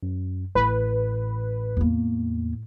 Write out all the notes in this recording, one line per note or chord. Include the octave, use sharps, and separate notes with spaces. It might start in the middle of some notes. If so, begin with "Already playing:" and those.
F#2
A1 A2 B4
E2 A#3